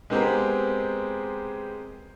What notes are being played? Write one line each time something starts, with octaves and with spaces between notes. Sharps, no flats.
G#3 B3 C4 G4 G#4 A#4